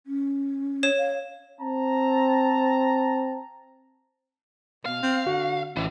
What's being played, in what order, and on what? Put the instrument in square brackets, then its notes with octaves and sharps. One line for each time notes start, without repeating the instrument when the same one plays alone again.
[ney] C#4
[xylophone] C#5 E7
[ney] F5
[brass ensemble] C4 A5 A#5
[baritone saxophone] B2 [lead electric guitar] F5
[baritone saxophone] C4
[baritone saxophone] D3 [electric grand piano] F#4
[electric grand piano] A1 [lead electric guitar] E3